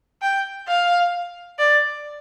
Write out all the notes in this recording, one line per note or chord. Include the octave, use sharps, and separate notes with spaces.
G5
F5
D5